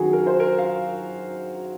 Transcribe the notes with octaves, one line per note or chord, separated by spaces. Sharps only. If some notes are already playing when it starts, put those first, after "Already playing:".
Already playing: F#2 D#3 F#3 F#4 G#4
A#4
C5
A#4
F5